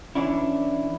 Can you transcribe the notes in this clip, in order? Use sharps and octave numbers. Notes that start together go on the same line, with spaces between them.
E3 C#4 D4 E4